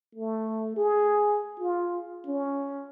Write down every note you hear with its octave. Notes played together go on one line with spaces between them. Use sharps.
A3
G#4
F4
C#4